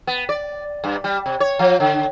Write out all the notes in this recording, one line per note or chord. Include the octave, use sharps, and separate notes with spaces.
B3
D5
G2
G3
C3
C#5
F3
D3